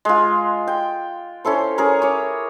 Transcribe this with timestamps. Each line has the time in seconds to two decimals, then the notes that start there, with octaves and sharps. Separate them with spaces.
0.05 G#3 F4
0.68 G5
1.45 C#4 E4 A4 C5
1.78 C#4 G#4 A#4
2.02 C#5 D6